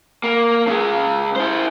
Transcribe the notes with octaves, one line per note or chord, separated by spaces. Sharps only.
A#3
C#3 G#3
E4 C5